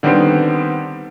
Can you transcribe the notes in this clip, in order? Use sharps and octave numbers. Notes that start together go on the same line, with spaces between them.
D3 D#3 G3 B3 C4